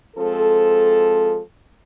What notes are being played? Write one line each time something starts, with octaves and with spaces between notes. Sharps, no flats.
F3 G#3 C4 A4